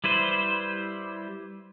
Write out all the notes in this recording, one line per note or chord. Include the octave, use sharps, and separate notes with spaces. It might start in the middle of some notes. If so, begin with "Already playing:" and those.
G3 E4 B4 C5